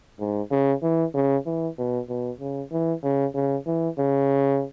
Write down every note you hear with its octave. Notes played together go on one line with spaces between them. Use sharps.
G#2
C#3
E3
C#3
E3
B2
B2
C#3
E3
C#3
C#3
E3
C#3